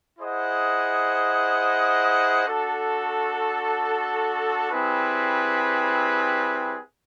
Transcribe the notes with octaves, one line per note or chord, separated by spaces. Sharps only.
E4 G#4 C5 D#5 F#5
D4 F#4 A4
G3 C4 E4 G#4 B4